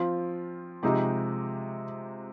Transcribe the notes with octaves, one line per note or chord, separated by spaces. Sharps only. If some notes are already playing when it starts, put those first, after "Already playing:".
Already playing: F3 C4 F4
C3 F3 G#3 D#4 G4